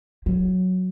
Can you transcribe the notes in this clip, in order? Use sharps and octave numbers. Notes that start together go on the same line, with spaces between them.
F#3